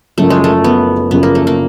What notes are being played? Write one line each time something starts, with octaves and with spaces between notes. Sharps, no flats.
F#1 F#2 C#3 F3 A3
G#3
A3
B3
F#1 F#2 C#3 F3 B3
A#3
A3
A#3